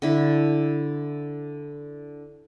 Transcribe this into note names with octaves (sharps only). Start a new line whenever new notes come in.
D3 E4 A4